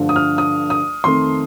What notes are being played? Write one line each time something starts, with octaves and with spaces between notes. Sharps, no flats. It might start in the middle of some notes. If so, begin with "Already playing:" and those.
Already playing: G2 D3 F3 A3
D#6
F6
D#6
D#6
F2 D#3 A3 C6